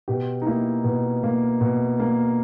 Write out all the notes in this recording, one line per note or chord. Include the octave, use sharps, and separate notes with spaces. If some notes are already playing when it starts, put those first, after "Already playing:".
B2 G4
D#4
A#3 E4
B2
A#3
B2
A#3